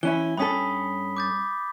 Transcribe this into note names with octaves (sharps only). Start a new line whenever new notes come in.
E3 C#4 E4 G7
G2 C#4 A4 B5 D#6 B6
D6 G6 A6